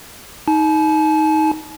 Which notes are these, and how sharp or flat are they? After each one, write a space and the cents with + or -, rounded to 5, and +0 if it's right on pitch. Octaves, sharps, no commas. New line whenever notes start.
D#4 +15 A5 -45